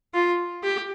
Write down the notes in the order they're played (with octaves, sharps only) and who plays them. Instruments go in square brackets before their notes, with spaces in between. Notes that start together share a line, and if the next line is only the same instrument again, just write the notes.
[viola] F4
G4